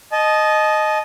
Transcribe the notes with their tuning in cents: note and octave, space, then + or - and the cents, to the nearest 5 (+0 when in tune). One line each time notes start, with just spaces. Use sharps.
D#5 -5 A5 -30